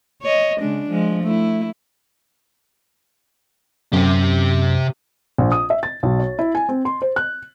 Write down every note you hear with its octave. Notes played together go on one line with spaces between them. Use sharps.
C#5 D#5
C#3 G#3 D4
F3 G#3
A3 E4
F#2 C3 G4
A#1
D#6
E5
A6
B1
C#5
E4
G#5
C4
C6
C5
F#6